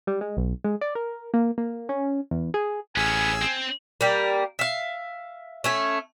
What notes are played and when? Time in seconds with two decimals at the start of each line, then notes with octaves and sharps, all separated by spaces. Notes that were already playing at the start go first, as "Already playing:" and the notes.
0.07 G3
0.21 G#3
0.37 B1
0.64 G#3
0.81 D5
0.95 A#4
1.34 A#3
1.58 A#3
1.89 C#4
2.31 E2
2.54 G#4
2.96 A1 B3 C#4 G#4 G#5 E6
3.42 C4
4.01 G3 A#3
4.59 E5 F5
5.64 A3 C#4 E5